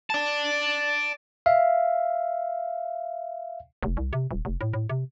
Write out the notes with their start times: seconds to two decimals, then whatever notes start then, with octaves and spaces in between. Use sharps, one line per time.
0.10 D5 A5
1.46 E5 F5
3.83 F1
3.97 C2
4.13 C3
4.31 D#1
4.45 F1
4.61 A2
4.73 A2
4.90 C3